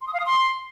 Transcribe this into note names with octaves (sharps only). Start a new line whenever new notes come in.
C6
D#6
F5
D#6
C6